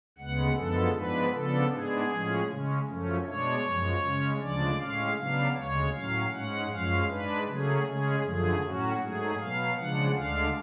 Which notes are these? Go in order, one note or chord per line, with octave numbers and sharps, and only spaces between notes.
D2 C#3 G#3 B3 F#5
F#2 D3 F3 G#3 B3 A4
G#2 F3 G#3 B3 D4 B4
C#3 F3 B3 D4 A4
G#2 G#3 B3 D4 G#4
A2 F3 G#3 C#4
C#3 G#3 C#4
F#2 F3 A3 C#4
B2 G#3 D4 C#5
F#2 F3 G#3
C#3 G#3 C#4
D2 C#3 F3 G#3 D4 D5
A2 G#3 C#4 F5
C#3 F#3 B3 D4 F5
D2 C#3 G#3 C#5
A2 F#3 C#4 F5
G#2 G#3 C#4 F#5
F#2 F3 G#3 C#4 F5
G#2 G#3 D4 B4
C#3 F#3 A3 C#4 G#4
C#3 G#3 C#4 G#4
F#2 D3 F3 A3 G#4
A2 F#3 C#4 F#4
G#2 F#3 A3 G#4
B2 F#3 B3 F5
C#3 F3 G#3 D4 F#5
D2 D3 G#3 D4 F5